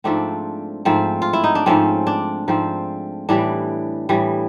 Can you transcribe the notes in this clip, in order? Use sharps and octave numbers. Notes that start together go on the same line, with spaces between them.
G#2 F3 A3 C4 D4
G#2 F3 A3 C4
F4
E4
D#4
D4
G#2 F3 A3 C4 C#4
D4
G#2 F3 A3 C4
A2 E3 G3 D4
A2 E3 G3